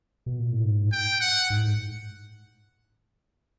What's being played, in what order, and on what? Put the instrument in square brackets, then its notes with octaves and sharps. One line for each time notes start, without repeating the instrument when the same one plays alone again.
[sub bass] B2
A#2
A2
G#2
[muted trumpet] G5
F#5
[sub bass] G#2
A2
G#2